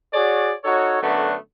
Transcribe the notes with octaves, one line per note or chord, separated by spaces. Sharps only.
F#4 G#4 C#5 D5
D#4 F#4 A4 C#5
F#2 D3 A3 B3 D4 F#4